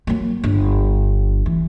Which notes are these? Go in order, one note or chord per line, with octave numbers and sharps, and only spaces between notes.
F#3 A#3
G1
E3